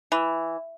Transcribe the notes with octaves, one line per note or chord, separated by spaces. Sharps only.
E3